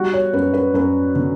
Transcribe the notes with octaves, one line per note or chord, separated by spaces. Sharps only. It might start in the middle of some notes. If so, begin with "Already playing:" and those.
Already playing: G3 F#4
C#5
F#2 B4
B4
F#2 B4
D3